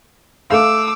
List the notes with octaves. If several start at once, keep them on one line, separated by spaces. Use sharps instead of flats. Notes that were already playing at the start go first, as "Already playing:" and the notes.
A3 F5 D6 E6